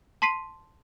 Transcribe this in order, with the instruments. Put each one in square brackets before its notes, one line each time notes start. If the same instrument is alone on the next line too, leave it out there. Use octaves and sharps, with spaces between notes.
[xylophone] A5 C6 B6 C7 D#7